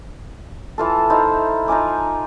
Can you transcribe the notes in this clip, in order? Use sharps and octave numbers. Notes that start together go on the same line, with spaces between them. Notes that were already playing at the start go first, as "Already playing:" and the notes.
E3 F4 A4
D#4 E4 C5 F5
D#4 F4 G#5 D6